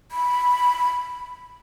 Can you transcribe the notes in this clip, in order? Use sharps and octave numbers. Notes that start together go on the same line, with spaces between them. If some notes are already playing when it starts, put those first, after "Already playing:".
B5